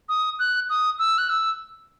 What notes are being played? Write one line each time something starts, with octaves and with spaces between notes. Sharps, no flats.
D#6
F#6
D#6
E6
F#6
E6